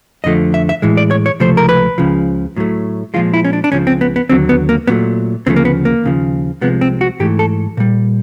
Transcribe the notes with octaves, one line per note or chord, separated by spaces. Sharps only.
F2 D3 F3 A3 D#5
E5
E5
A2 E3 G#3
D5
C#5
C#5
C#2 C3 F3 A3 C5
A#4
B4
C#2 C#3 F3
A2 F#3 A3
A#2 F3 G#3 F4
E4
C#4
D4
D4
C#2 C#3 F3 C#4
C4
B3
B3
D#2 D3 F#3 C4
B3
A#3
A#2 F#3 A3 B3
D2 C#3 F3 A3 C4
A#3
B3
A#3
D#2 C#3 F3
C2 C3 F3 G#3 B3
C4
F#4
G#2 E3 A3 G4
A4
A#2 G3